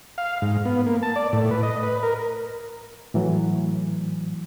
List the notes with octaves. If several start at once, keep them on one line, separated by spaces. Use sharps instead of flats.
F5
G#2
B3
A#3
A5
D5
A2
B4
D#5
B4
A#4
A2 E3 F#3